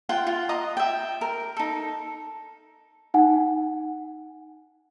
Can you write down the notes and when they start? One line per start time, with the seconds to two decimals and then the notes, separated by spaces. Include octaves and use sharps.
0.09 F4 F#5 G5
0.27 F4
0.49 D#5 A#5 D#6
0.77 E5 G5
1.21 A#4
1.56 D#4 A4
3.14 D#4 F#5 G#5